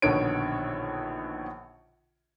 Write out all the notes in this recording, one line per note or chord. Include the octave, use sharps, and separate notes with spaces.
A#1 B2 D3 D#3 C#5 D7